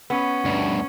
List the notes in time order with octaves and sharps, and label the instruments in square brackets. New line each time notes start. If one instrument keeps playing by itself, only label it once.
[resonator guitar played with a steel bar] B3 [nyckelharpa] C#4
[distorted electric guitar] D2 G2